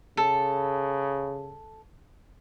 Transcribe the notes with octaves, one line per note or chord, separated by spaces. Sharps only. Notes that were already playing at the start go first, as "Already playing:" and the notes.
C#3 A4